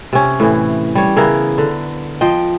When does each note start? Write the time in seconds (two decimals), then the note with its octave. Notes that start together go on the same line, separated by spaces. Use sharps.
0.13 C3 C#4
0.40 A2 E3
0.95 G3 C#5
1.17 C#3 B3 E4 A#4
1.58 D3
2.21 F3 D#5 G5